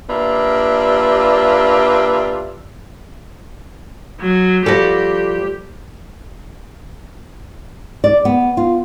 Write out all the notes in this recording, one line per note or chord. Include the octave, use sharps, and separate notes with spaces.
G3 A#3 D4 F4 B4 E5
F#3
F3 G3 F#4 G4 A4
D5
B3
F4